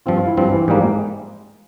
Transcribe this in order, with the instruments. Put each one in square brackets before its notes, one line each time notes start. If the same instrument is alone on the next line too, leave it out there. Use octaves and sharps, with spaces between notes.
[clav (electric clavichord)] G2 F3 C4 [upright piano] F4
[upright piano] F4
E4
[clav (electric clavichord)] G2 F3 C4
[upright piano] E3
[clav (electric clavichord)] G#2 G3 A#3 [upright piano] F3
[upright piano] G#3